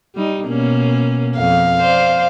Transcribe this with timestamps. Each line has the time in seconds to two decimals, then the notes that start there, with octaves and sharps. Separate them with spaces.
0.15 G3 D#4
0.46 B2 A#3 C#4
1.37 F2 F5
1.80 C5 D5